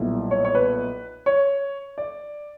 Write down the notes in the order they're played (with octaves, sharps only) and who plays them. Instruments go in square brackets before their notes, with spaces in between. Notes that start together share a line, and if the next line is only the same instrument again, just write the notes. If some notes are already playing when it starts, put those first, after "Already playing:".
Already playing: [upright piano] B1 A#2 G3 B3 E4
C#5
C#5
B4
C#5
D5